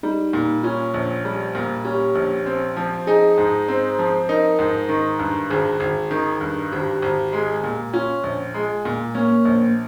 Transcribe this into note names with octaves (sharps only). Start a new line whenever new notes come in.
G3 D#4
A#2
C#4 F4
A#1
G3
A#2
C#4 G4
A#1
C4
F3
D#4 G#4
G#2
C4
F3
D#4 A#4
G#2
D#3
G2
G#1 G#4
G#1
D#3
G2
G#1 G4
G#1
G#3
A#2
C#4 F4
A#1
G#3
A#2
A#3 C#4
A#1